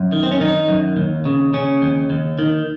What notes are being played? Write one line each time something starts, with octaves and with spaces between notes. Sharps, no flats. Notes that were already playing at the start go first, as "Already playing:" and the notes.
Already playing: F#2
D#3
C4
C#4
D#3 D#4
F#2
D#2
C#3
C#3 C#4
D#2
D#2
D#3